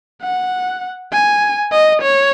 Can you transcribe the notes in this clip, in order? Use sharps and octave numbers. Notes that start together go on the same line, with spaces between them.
F#5
G#5
D#5
C#5